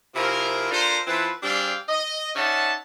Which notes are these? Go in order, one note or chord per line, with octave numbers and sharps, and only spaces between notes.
C3 F3 E4 G#4 A#4
D4 F4 A4 A#4 C5
E3 C4 F4 A4 B4
G3 C4 D4 G#4 F5 G5
D#5
C#4 D#4 D5 E5 F#5 A5